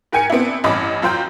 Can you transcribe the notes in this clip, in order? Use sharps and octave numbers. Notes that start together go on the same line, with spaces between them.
G#2 A#4 G5 G#5 G#6 C#7
B3 C4 D4 E4
A1 G2 C#4 D#5 B5 D6
F#2 F4 C5 G5 G6